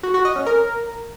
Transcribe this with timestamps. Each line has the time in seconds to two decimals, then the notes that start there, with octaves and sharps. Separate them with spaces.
0.03 F#4
0.14 F#4
0.25 D#5
0.36 C#4
0.46 A#4